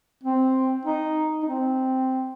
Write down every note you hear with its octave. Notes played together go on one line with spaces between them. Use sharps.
C4
D#4
D#4
C4